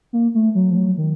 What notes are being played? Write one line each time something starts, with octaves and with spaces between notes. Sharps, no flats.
A#3
A3
F#3
F3
F#3
D#3